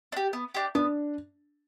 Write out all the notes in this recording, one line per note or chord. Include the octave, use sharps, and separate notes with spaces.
D4
G4
B3
D4 G4
B3 D4